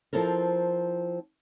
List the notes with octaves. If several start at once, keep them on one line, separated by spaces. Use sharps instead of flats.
F3 C4 E4 A4 A#4